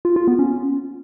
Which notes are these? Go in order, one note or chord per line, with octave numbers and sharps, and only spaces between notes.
F4
F4
B3
C#4